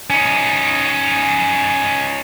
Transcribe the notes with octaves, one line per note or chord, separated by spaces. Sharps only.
C#4 D#4